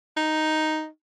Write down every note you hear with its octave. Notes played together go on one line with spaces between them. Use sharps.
D#4